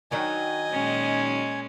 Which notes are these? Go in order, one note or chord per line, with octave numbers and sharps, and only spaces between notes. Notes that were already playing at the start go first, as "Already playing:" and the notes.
D#3 F#3 D4 D#5 G#5
A#2 G#3 C#4